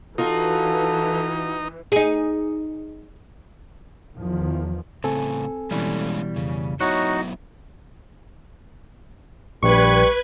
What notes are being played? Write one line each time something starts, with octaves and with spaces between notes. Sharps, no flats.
E3 D#4 F4 F#4 A4
D#4 G#4
E2 D#3 F3
A2 C#3 C4 A4 G#5
B2 E3 G3 G#3 C#4 D4
F2 C#3
F#3 B3 D#4 E4 F#4 C#5 F#6
A#1 G3 B4 C#6 G#6